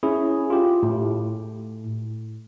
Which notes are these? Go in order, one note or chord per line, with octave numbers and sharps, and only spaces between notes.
C#4 E4 G#4
F4 G4
A2